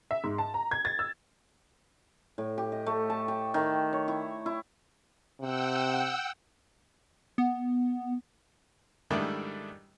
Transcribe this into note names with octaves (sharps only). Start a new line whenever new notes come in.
E5
G#2
A5
A#5
G#6
A6
E6
A2
G4
D#5
A3
A5
G5
D#3
C#5
E4
E4
C3 F#5 G5 E6
B3
G#2 D#3 G3 A3 D4 E4